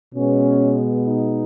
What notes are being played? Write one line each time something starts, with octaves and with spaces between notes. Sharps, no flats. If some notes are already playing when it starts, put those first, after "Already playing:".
B2 G#3 B3 C#4
D#4